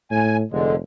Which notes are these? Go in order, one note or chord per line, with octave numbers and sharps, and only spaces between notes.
A2 G#5
F1 D3 G#3